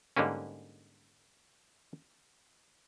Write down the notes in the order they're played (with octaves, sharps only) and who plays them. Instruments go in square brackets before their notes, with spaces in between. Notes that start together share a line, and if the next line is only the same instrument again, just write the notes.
[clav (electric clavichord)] G#2 D3 G3 A#3 C#4